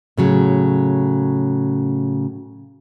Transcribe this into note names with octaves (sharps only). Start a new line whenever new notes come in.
A2 C#3 F#3